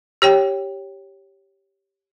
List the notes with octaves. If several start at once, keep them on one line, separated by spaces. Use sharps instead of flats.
G4 C#5 G5